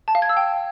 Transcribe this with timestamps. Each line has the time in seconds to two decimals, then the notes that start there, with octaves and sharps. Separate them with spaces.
0.08 A5
0.15 F5
0.22 G#6
0.29 E6
0.37 G5